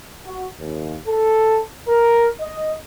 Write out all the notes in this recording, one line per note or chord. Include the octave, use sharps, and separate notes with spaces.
F#4
D#2
A4
A#4
D#5